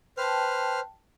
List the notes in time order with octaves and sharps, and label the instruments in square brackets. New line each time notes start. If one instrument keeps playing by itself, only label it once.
[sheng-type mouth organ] B4 C5 F6 [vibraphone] G5 A5